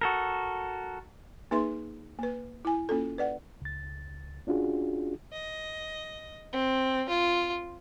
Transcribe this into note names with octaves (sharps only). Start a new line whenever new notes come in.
F#4 A4 A#4
A#3 D#4 G#4 B4 E5 C6
A#3 B4
E4 G#5
A#3 C#4 F4 A4
B4 D5 F#5
C#2 A6
C#4 D4 F4 F#4 G#4
D#5
C4
F4